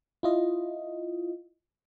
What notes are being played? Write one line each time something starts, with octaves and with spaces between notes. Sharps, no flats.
E4 F4 D#5